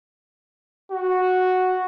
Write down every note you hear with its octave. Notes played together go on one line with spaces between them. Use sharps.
F#4